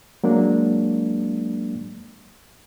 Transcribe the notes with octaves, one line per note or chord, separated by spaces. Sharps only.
F#3 G#3 A#3 D4